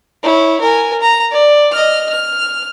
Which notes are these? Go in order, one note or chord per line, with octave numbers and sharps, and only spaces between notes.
E4 C#5
A#4 G#5
A#5
D5
D#5 F6
F6